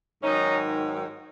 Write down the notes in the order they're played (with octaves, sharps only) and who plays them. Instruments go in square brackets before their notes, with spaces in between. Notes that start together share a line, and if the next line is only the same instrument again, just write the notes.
[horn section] G#2 D#3 F#3 C#4 D#4